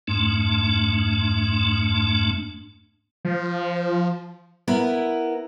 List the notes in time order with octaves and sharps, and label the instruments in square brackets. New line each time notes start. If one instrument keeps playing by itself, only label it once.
[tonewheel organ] F2 G#2 A3 D4
[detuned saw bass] F3
[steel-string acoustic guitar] B3 E4 A#4